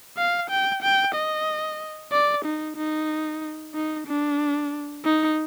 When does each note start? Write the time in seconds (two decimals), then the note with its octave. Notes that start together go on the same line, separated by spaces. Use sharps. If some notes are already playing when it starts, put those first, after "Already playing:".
0.17 F5
0.50 G5
0.83 G5
1.14 D#5
2.12 D5
2.45 D#4
2.77 D#4
3.74 D#4
4.07 D4
5.04 D#4